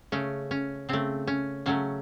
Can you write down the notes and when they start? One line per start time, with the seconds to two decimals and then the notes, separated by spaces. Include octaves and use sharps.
0.12 C#3 A3 C#4
0.51 C#4
0.89 C#3 A3 C4
1.27 C#4
1.66 C#3 F#3 A3 C#4